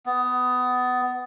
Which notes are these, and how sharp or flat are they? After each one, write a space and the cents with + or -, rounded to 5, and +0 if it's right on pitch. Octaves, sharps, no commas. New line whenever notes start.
B3 +20